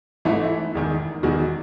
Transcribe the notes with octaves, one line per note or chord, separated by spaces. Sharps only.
G#1 G#2 E3 A3 E4
E4
E1 E2 D#3
E1 E2 D#3 F#4